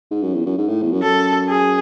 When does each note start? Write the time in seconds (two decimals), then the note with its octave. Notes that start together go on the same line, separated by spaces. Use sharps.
0.11 G#2
0.23 F#2
0.34 E2
0.46 F#2
0.58 G#2
0.69 A2
0.82 E2
0.92 F#2
1.03 F#2 A4
1.49 G#4